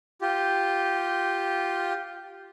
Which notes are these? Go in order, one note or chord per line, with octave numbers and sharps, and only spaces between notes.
F4 G4